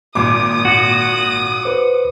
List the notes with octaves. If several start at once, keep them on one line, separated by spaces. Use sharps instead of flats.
G#1 A#2 D6 D#6
F#4
B4 C5 D6